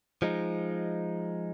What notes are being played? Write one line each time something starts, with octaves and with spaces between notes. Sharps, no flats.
F3 G#3 D#4